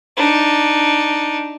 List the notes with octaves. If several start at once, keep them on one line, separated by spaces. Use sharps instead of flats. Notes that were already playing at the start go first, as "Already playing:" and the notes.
D4 D#4